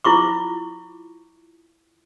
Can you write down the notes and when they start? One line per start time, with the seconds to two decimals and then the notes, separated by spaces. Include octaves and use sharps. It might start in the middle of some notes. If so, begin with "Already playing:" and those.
0.04 E4 F4 C#6 D6